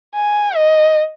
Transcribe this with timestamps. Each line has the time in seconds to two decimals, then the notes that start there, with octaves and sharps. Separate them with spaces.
0.15 G#5
0.55 D#5